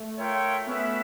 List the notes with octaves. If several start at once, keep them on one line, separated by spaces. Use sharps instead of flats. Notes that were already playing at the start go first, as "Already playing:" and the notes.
Already playing: A3
F4 A#4 C#5 E5 G5
B3 C#4 F#4 B4 E5